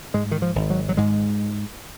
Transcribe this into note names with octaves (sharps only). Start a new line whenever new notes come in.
G#2 G#3
D#3
F3
G#1
F#3
F#3
G#2 G#3